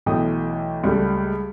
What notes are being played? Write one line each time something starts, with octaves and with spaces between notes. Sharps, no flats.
B1 E3 A3 G5 D#6
C#2 G3 A3